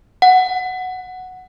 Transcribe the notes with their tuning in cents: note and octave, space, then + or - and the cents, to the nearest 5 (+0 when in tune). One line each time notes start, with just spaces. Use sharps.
F#5 +0